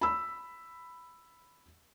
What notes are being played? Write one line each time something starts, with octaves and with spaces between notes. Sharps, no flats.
B5 E6